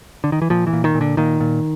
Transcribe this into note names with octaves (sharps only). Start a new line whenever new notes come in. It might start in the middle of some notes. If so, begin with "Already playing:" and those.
D3
D#3
E3
A#2 F3
E3
A#2
D#3
A#2
D3
A#2 D#3
A#2